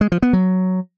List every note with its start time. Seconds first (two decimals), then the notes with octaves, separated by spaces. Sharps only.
0.01 G#3
0.12 F3
0.22 B3
0.33 F#3